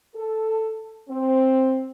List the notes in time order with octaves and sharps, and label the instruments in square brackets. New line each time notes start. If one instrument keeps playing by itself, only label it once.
[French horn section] A4
C4